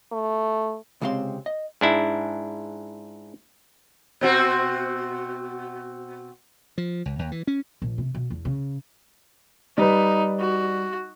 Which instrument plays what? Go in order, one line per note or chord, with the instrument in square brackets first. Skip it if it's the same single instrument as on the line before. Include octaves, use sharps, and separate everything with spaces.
[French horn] A3
[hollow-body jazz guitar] C#2 C3 G#3 C4 F5 C6
D#5
[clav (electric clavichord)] G#2 D4 E4
[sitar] B2 C4 F#4
[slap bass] F3
C#2
D#2
E3
C#4
[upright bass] A#1
C3
B2
E2
C#3
[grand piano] G3 B4 [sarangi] D#4
[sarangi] F#4